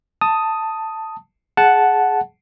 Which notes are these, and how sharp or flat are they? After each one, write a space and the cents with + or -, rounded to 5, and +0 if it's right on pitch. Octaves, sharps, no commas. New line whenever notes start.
A5 +10 D#6 +5
G#4 +15 F#5 +0 A5 -10